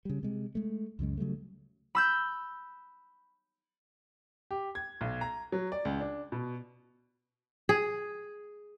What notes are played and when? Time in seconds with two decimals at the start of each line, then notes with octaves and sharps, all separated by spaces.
0.05 C#3 G3
0.23 C3 G#3
0.55 G#3 A3
0.99 C#2 F#2 C#3 G#3
1.17 C#3 F#3 G3 A3
1.95 B5 E6 G6
4.51 G4
4.75 G#6
5.01 B1
5.21 A#5
5.52 F#3
5.72 D5
5.85 C#2
6.00 D4
6.32 B2
7.69 G#4